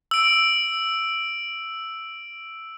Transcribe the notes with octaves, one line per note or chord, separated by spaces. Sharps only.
E6 D7